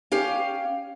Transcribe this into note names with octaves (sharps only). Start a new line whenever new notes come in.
C#4 G4 F5